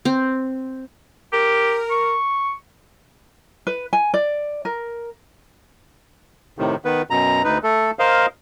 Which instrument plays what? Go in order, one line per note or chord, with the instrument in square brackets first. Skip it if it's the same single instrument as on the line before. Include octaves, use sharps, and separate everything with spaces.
[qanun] C4
[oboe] G4 [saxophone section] A#4
[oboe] C#6
[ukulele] B4
G#5
D5
A#4
[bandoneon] A2 C3 D#3
D#3 B3 B4
F#2 B2 A#5
D2 D#4 B4
A3 A4
A#4 C5 D#5 F5